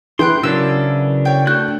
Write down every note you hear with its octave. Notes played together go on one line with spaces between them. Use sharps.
E3 B3 G5 C6 F#6 G6 D7
C#3 F#3 C#4 D4 F#4 A#4 E6
C#5 G5
A3 D4 F#4 A4 G5 F#6 G6